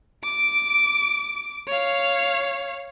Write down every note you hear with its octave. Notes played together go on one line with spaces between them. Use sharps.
D6 D7
C#5 F5